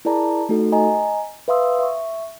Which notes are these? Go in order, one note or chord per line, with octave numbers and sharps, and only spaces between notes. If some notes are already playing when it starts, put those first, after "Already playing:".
E4 G#4 A#4 D5 A5 A#5
A3 D#4 F#4 A4
D#5 G#5 A#5
B4 E5 F5 C6 D#6 E6
E5 C#6